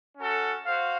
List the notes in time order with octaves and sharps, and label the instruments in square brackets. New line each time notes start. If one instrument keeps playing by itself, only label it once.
[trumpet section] C#4 F#4 A4
F#4 C5 F5